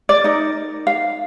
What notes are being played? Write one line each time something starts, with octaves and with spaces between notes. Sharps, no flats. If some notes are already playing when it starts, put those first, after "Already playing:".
D5
D#4 A#4
F5